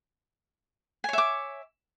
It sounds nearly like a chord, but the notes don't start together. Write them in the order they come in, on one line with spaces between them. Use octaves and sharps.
G#5 C#5 E5 D6